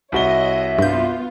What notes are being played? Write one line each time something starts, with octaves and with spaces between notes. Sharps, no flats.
C2 F#4 C#5 D#5 E5 G7
G2 B3 F4 G6